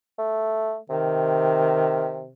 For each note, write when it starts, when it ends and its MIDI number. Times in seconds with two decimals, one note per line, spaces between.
0.18 0.78 57
0.89 2.33 48
0.89 2.28 51